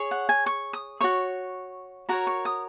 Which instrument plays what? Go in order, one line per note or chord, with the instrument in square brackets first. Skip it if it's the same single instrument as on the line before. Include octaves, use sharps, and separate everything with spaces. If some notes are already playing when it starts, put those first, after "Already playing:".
Already playing: [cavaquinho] G#4 C#5
F#5
G#5
C#6
D#6
F#4 C#5 C#6
F#4 A#4 C#5 A#5
C#6
D#6